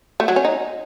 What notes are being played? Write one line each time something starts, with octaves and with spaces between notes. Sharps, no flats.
A3
F#3
C#4
D#4